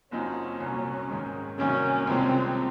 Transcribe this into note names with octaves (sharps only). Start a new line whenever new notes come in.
F#1 F#2 F3 C4 C#4 D#4
C2 A#2 F#3
G#2 D#3 G#3
C2 C3 D#3 F#3 A#3 C#4
C2 C3 F3 G#3 C4 C#4